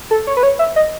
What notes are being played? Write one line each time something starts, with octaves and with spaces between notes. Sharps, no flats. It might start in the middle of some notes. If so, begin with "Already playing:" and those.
A4
C#5
B4
C#5
E5
D#5